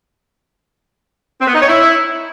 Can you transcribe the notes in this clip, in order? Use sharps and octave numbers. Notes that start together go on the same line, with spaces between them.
C4
B3
D#4
C#5
E4